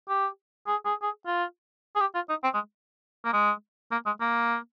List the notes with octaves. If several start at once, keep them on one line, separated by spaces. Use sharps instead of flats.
G4
G#4
G#4
G#4
F4
G#4
G4
F4
D#4
C4
G#3
A#3
G#3
A#3
G#3
A#3